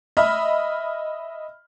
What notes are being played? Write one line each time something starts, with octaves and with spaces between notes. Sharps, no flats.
D#5 E5 B5 F6